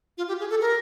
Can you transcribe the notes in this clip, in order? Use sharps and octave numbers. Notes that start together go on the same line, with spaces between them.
F4
G4
G#4
A4
A#4